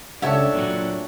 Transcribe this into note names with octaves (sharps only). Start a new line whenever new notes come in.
C#2 D4 G4 A4 C#5 E5 F#5
A#2 F#3 F#4